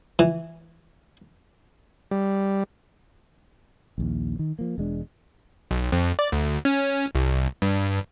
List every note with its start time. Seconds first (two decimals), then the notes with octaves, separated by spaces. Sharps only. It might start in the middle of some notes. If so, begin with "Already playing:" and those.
0.19 E3
2.11 G3
3.98 A#1 D#2
4.39 D#3
4.59 F3 A#3
4.78 E1 G#3 D4
5.71 B1
5.92 F2
6.19 D5
6.32 D2
6.65 C#4
7.15 C2
7.62 G2